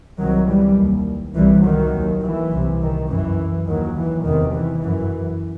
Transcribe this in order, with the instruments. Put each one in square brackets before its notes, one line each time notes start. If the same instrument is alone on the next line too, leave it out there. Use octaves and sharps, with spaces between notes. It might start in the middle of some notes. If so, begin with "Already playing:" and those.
[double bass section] C2 C3 D#3 F#3
E3 G3
D#2
C2 C3 E3 G3
D#3 F#3
D#2
E3
C2 C3
D#3
F#2 E3
D#2 D#3 F#3
E3
E2 C3 D#3
E3
F#2 E3